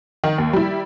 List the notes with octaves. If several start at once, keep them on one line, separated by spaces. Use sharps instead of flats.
D#3
D#2
G3 E4